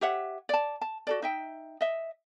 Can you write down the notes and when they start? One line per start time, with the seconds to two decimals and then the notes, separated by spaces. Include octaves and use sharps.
0.01 G4 C#5 E5 F#5
0.49 D5 A5
0.81 A5
1.07 F#4 A4 D5
1.22 D#4 E5 G5
1.81 D#5 E5